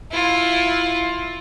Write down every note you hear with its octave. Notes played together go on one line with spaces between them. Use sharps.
E4 F4